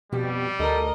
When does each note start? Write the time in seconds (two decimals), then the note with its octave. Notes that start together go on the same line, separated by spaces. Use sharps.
0.12 F2 B2 G3 F#4 G4
0.59 D2 A4 A#4 D#5